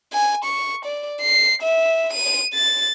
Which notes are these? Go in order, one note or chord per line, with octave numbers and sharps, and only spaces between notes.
G#5
C#6
D5
C7
E5
D#7
A6